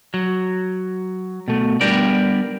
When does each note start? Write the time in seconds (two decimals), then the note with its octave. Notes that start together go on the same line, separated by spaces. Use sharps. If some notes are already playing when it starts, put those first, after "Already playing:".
0.14 F#3
1.48 B2 A3
1.81 G3 B3 D4 G4 A#4 D5